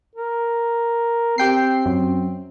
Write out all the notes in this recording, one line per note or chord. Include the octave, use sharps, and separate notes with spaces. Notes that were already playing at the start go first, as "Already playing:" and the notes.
A#4
C4 G4 G5 C7
F#2